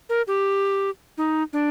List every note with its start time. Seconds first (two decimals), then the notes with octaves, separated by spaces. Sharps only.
0.09 A#4
0.27 G4
1.18 D#4
1.53 D4